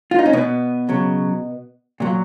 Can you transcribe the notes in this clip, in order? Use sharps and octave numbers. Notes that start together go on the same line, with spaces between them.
F4
D#4
C#4
B2 B3
C#3 F#3
A#2 F#3